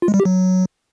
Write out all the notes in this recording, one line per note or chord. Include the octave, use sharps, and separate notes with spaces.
F4
G#3
G3
G4
F#3